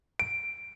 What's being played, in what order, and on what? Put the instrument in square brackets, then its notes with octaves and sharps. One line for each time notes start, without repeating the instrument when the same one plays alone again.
[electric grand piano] D7